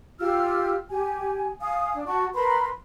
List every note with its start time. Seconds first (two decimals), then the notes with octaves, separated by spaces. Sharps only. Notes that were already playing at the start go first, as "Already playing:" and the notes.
0.19 F4 G4 E6 F6
0.89 G4 G#5
1.60 F5 G#5 D#6
1.93 D4
2.07 F#4 A5 C#6
2.35 A#4 B4 B5 C6